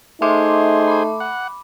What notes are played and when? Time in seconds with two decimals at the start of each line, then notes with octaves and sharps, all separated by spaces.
0.22 A3 D#4 G#4 C5 E5 C6 D6
0.87 B5 D6
1.20 F#5